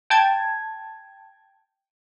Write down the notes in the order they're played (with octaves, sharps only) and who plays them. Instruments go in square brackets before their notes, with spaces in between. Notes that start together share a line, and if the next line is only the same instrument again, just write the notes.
[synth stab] G5 A5 G#6